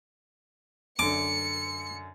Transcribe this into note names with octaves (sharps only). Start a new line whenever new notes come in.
F#2 D3 D6 C#7